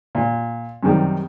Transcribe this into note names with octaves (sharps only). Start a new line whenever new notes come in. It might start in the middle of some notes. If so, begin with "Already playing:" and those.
A#2
F#2 C3 D#3 G3